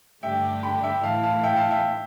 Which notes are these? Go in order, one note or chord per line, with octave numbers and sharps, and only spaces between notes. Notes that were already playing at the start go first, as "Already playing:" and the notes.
G2 D3 A3 D4 G4 E5 G5
G5 B5
E5 G5
A2 E3 A3 E4 F5 A5
F5 A5
E5 G5
F5 A5
E5 G5